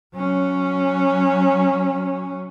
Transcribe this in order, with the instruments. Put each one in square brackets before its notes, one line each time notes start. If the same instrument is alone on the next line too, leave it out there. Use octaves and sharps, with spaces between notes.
[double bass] F#3 C#4